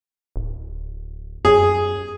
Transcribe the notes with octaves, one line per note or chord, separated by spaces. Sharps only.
D1
F#2 G#4